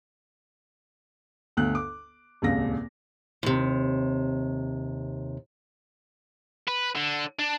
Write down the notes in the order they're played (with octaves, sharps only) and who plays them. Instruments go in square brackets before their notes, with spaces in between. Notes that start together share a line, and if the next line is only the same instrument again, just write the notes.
[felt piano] G1 D2 F#6
D6
D#1 G#1 C#2 A#6
[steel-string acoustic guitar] D#2 C3
[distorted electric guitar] B4
D3
D4